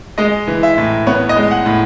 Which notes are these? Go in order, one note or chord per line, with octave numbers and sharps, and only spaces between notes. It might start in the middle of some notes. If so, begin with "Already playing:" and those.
G#3 D#5
E3
E5
A2
B3 C#5
D#5
G#3
F#5
A2